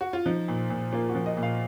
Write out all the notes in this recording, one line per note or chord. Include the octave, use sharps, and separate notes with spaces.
F#4
F4
F3 D#4
A#2
A#2
A#3 F4
F#4
F3
D#5
A#2
F5